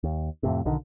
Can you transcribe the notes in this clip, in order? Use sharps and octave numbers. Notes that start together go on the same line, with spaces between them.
D#2
F2 A2 C3
B1 D3 D#3